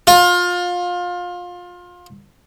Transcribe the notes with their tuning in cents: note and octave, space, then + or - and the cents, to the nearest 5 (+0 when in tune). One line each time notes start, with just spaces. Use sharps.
F4 +25